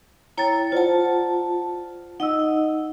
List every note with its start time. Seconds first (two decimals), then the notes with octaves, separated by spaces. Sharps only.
0.37 E4 C#5 G5 A#5 A6
0.72 F4 C5 D5 F#5 A5
2.20 D#4 D#5 F#5 E6